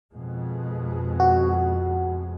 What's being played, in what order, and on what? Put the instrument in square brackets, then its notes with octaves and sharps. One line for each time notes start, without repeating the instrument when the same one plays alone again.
[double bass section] F2 B2 G#3
[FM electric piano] F#4